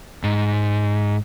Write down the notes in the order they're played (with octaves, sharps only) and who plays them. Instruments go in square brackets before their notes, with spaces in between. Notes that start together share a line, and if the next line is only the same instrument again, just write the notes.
[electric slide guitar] G#2